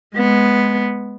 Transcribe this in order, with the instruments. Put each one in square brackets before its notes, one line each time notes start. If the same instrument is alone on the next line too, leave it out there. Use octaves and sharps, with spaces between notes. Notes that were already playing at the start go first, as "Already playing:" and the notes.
[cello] G#3 B3